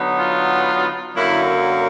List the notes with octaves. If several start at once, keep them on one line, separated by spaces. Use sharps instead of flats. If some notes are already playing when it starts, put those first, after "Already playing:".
Already playing: D3 F#3 B3 D#4
F4
F#2 D3 F#3 A#3 E4